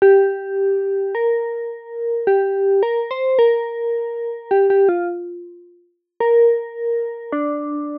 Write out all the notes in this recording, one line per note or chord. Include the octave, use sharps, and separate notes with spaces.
G4
A#4
G4
A#4
C5
A#4
G4
G4
F4
A#4
D4